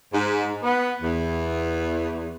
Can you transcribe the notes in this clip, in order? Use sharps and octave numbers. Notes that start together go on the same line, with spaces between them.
G#2
B3
E2